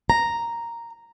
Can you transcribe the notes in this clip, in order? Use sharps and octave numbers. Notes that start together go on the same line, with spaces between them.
A#5